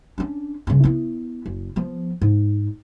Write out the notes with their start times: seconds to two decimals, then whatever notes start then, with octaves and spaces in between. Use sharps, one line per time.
0.18 C#4 D4
0.67 G2 C#3
0.84 B3 E4
1.46 F#1
1.76 F3 B3
2.22 G#2